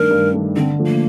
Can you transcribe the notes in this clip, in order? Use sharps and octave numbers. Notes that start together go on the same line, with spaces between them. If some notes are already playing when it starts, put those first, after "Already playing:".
Already playing: G2 D#3 A3 D4 A#4
G2
D#3 A3 D4
D3 C4
F3 A3
A#3